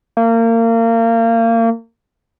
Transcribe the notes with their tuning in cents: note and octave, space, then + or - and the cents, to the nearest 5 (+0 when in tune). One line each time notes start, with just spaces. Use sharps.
A#3 -30